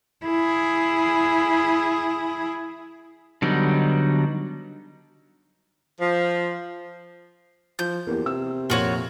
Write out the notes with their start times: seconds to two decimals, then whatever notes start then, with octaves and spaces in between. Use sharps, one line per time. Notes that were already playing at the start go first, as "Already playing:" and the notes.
0.24 E4 G#4
3.42 D3 F#3 G3 B3 D#4
6.00 F3
7.79 F3 G6
8.07 E2 A#3 G4
8.26 C3 E6
8.70 F2 A#2 F4 F#4 C#5